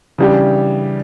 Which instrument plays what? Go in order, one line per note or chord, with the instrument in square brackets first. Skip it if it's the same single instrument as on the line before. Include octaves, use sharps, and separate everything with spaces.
[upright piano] C#3 E3 G3 D4 G4